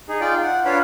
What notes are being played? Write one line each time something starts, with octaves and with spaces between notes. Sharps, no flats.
D#4 G#4
F4 D5 G5
F#5
D4 F4 B4 C#5 F5 B5